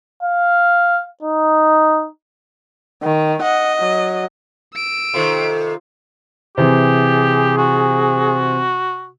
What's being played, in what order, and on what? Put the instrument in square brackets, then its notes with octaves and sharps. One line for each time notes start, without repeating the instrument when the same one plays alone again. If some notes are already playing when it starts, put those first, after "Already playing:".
[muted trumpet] F5
D#4
[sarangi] D#3
[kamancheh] D#5 [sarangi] F#5
[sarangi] F#3
[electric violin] E6 D7
[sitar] C3 D#3 [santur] F4 C5 [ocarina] A4
[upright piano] C3 E3 [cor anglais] G4 [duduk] G#4
[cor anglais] F#4